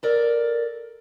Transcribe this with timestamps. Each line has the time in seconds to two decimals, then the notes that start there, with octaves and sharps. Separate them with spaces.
0.03 A4 A#4 D5